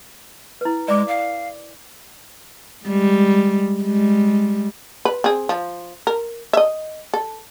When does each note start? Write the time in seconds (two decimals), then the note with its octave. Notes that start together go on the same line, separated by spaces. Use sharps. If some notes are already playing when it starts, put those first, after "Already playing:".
0.61 E4 B4
0.88 G#3 D5 D6
1.08 F5
2.85 G3 G#3
3.83 G3 G#3
5.05 B4
5.24 C4 G#4
5.49 F3
6.07 A#4
6.53 D#5 E5
7.14 A4